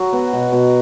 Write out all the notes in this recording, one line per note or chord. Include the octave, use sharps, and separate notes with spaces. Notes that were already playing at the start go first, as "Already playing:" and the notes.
Already playing: F#3 F#4
B3
B2
B2